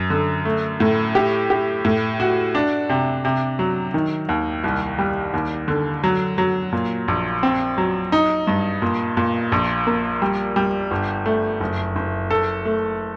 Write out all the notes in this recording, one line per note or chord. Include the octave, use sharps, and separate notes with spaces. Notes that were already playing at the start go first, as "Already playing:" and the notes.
Already playing: F#2
D3
A3
A2
G4
G4
A2
F#4
D4
C3
C3
F#3
D#3
D#2
C2
G3
D#2
D3
F#3
F#3
A#2
A#1
C4
F#3
D#4
G2
A#2
A#2
A#1
A#3
G3
G3
G1
A3
F#1
F#1
A4
A3